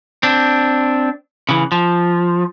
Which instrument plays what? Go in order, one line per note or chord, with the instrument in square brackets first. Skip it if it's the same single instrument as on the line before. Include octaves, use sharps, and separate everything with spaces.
[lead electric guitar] C4 D4
C#3 E3
F3